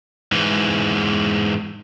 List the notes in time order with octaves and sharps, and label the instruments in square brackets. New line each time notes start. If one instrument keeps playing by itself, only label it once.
[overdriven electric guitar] G#2 E3